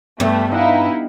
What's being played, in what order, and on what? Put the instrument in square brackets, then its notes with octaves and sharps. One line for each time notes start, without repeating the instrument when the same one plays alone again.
[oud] G2 [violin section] A3 [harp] B3
[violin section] D#4 E4 [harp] D#5 F#5 [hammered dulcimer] F5